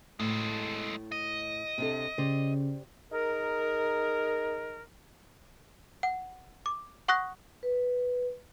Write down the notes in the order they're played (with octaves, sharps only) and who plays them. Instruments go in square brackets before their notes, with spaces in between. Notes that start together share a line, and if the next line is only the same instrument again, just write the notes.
[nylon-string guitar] A2 [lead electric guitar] G#3 A4
[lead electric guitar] D#5
[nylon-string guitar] C3 D4 A4
[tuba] C#3 [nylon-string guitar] G4 C5 D5
[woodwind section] D#4 G#4 A#4
[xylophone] F#5
D6
F#5 C#6 D#6 F#6 A#6
[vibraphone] B4